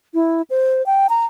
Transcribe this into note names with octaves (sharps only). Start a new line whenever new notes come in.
E4
C5
G5
A#5